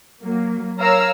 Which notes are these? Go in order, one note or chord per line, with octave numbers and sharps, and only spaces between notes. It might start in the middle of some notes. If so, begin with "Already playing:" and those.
F#3 A#3
A#4 C#5 F5 A#5 E6 F6